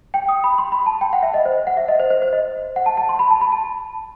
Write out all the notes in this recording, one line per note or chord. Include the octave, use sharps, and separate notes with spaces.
G5
D#6
B5
C6
B5
A5
G5
F#5
E5
D#5
C5
F#5
E5
D#5
C5
C5
C5
D#5
F#5
A5
A5
C6
B5
A5
B5
A5